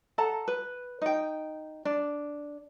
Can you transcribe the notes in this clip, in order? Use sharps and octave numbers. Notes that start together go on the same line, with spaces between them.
A4 F#5 A5 A#5
B4
D#4 G5
D4